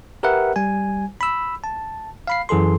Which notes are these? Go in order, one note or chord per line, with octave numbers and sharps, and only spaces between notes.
G4 A#4 B4 E5 F#5
G3 G#5
B5 E6
A5
F5 B5 C7
F#2 E3 G#4 A4 C6